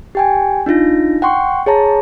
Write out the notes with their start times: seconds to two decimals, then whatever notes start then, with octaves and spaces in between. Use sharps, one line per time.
0.15 G4 G5 G#5
0.66 D4 D#4 F4 A#6
1.22 F#5 G5 C6 C#6
1.66 G#4 C#5 A5 A#5